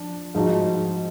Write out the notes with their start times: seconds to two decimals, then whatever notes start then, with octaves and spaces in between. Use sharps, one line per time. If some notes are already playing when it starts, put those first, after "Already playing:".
Already playing: F3 D4
0.35 G#2 F3 G#3 D#4 F#4